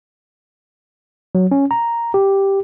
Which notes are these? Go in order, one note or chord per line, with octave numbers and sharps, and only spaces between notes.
F#3
C#4
A#5
G4